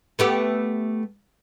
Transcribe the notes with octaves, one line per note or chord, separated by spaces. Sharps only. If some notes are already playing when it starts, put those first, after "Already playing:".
A3 B3 G4